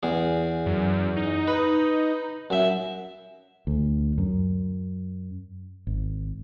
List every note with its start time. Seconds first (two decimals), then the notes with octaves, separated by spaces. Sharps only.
0.03 E2 G#4
0.66 F#2
1.17 D#4
1.48 B4
2.50 F#2 E5
3.67 D2
4.18 F#2
5.87 G#1